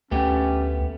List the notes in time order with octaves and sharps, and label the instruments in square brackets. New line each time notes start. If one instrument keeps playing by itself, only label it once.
[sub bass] D2 [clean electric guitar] A3 B3 G4 [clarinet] C#4